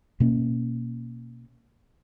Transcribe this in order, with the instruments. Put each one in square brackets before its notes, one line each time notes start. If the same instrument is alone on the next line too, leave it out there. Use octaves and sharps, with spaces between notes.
[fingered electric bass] B2 A#3 C#4